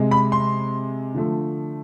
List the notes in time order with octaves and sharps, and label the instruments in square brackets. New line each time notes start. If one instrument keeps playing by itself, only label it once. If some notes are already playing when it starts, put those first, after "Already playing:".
Already playing: [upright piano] C3 G#3
B5
C6
D3 F3 A3